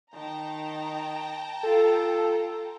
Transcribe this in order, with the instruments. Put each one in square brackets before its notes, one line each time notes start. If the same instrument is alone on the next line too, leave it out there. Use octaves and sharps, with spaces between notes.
[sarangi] D#3 [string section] G5 A5 A#5
[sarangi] F4 [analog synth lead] A4